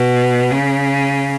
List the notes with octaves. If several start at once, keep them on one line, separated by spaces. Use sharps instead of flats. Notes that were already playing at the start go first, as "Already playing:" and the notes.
Already playing: B2
C#3